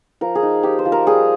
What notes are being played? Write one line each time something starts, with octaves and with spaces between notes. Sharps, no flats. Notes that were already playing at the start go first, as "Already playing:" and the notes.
F3 A#4
G#4
D#4
F3 G4
C5
F3
A#4
G3 G#4